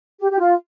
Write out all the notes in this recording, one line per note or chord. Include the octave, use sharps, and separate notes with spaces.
G4
G4
F4